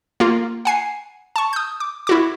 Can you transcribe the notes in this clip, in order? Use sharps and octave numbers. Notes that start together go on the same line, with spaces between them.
A#3 F4
F#5 G#5 C7
A5 C#6
D#6 G6
D6
E4 F#4 D6